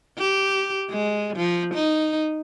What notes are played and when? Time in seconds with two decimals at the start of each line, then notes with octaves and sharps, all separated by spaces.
0.18 G4
0.90 G#3
1.36 F3
1.75 D#4